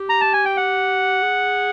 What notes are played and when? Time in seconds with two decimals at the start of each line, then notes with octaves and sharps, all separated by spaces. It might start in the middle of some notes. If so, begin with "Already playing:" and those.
Already playing: G4
0.09 A#5
0.21 A5
0.33 G#5
0.45 G5
0.57 F#5
1.23 G#4